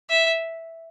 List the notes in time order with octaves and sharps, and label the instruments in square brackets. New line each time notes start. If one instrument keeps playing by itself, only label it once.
[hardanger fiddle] E5